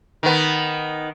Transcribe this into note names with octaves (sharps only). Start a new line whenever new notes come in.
D#3 B3